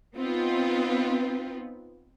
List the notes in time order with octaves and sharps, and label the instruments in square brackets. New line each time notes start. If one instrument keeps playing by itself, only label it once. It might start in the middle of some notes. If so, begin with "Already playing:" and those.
[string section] B3 C4 D#4 F4 B4